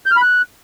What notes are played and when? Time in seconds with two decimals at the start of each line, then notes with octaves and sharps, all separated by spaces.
0.06 G6
0.11 F6
0.16 B5
0.22 F#6